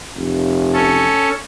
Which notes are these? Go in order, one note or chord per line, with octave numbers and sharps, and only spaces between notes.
F1
C#4 A4